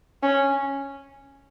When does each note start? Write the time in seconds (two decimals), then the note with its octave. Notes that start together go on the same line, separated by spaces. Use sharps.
0.23 C#4